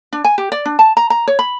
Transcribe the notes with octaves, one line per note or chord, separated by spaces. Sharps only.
D4
G#5
G4
D5
D4
A5
A#5
A#5
C#5
B5